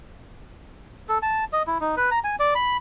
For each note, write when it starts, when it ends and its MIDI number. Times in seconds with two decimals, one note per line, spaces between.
1.09 1.18 69
1.22 1.44 81
1.53 1.63 75
1.67 1.78 64
1.81 1.95 63
1.97 2.10 71
2.11 2.19 82
2.24 2.36 80
2.40 2.54 74
2.55 2.77 83